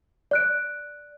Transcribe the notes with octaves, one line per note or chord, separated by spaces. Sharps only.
D5 F#6 D7